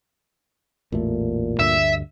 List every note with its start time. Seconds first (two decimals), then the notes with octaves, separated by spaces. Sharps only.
0.92 A1 E2 A#2 A3
1.60 D2 G2 D3 E5